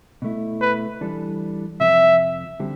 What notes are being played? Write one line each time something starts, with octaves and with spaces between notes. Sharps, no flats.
B2 A3 E4
B4
E3 G3 D4 A4
F2 C3 F3 E5
D3 G3 C4 G4